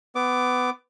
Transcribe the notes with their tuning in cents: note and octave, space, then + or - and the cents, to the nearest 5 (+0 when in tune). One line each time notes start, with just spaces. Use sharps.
B3 +20 D6 +0